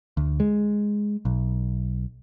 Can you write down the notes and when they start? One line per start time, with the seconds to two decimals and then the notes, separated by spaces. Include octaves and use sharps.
0.17 D2
0.40 G#3
1.25 B1